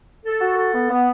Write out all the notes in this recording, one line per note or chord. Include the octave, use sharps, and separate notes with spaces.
A4
F#4
A4
B3
B3